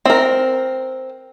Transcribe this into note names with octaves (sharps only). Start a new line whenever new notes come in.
C4 A#4